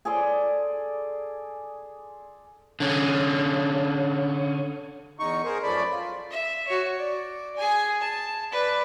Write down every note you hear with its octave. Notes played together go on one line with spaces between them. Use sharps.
G#4 A4 D5 C6
D3 C#4
E2 D#4 C#6
G#4 A#4 C5
F#2 F3 A3 D5 B5
F4
E5
F#4 C#5
D5
G#4 G#5
A5
B4 D5